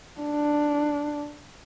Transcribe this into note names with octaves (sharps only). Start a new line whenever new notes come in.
D4